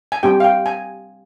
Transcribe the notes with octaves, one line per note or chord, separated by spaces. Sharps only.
G#5
G3 C4 G4 G5
F5
G5
G#5